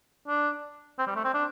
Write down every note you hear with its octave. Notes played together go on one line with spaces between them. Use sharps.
D4
C4
G3
A3
C4
D4